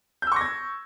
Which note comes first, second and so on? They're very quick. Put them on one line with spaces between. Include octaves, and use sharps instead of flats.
G6 E6 C#6 A#6 G#6